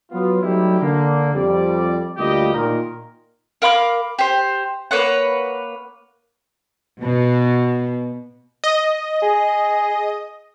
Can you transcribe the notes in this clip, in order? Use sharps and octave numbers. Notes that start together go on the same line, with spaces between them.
F#3 B3 F4
F#3 G3 A3 D#4 E4 G4
D3 A#3
F2 G3 D5
D2 G3 A#3 F4 G4 D#5
A#2 D#3 A#4
A#4 F5 B5 D6
G4 C5
A#3 B4 C#5 F#5
B2
D#5
G#4